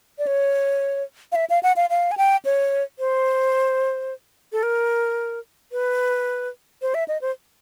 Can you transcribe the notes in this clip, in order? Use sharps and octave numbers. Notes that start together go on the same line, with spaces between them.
D5
C#5
F5
E5
F5
F#5
F5
F5
G#5
G5
C#5
C5
A4
A#4
B4
C5
E5
D#5
C5